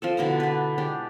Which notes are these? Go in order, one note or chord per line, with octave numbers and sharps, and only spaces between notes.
F3 C4 A4
B2 D3 E4 A#5
D4 B4
G#3 D4 G4